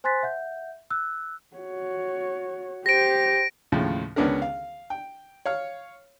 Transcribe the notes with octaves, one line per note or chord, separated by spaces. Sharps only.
C5 G#5 C6 F#6 A6 B6
E5 F#5 G6
E6 F#6
F#4 C#5
G4 C5 A#6 D7
D#2 A2 C#3 F3
C#2 D3 B3 C#4 D4 A#4
F5
G5
C#5 F5 F6